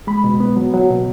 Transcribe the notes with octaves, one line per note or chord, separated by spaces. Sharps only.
G#3 B5
B2
B3
F#3
F#3
B2